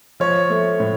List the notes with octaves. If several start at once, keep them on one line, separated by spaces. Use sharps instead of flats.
F3 C#5
A3
A2